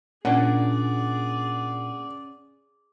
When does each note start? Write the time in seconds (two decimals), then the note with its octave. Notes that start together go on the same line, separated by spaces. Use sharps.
0.25 A#2 C#4 D4 G#4 D5 F#5